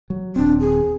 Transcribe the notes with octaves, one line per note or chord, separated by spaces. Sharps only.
F#3
D#1 C4 D4
G#4